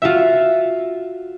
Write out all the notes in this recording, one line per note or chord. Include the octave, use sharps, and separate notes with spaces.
F4 F#4 E5